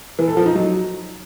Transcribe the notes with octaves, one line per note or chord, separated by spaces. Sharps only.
E3
A4
F3
D#4
F#3